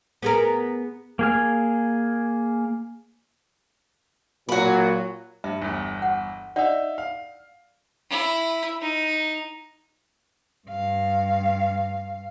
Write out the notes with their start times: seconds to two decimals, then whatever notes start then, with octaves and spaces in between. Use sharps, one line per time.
0.22 B3 G#4 A#4
1.19 A#3 G#4 F6
4.49 A#2 F#3 F#4 B4
5.44 G2 E5
5.62 G1 E2
6.02 F#5
6.56 D#4 D5 E5 F#5
6.98 F5
8.10 E4
8.81 D#4
10.68 G2 F5